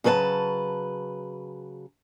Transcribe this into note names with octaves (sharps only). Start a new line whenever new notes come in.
C#3 F#3 B4 E5 A5